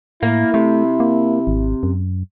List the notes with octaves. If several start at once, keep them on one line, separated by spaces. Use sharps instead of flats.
A2 A#3 E4
C3 A3
A#3
G#1
F#2